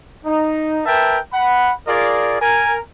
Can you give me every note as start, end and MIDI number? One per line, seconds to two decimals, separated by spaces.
0.25 0.80 63
0.85 1.18 70
0.85 1.18 71
0.85 1.18 76
0.85 1.18 79
0.85 1.18 81
1.33 1.72 78
1.33 1.72 83
1.88 2.39 65
1.88 2.39 68
1.88 2.39 70
1.88 2.39 74
2.41 2.77 70
2.41 2.77 80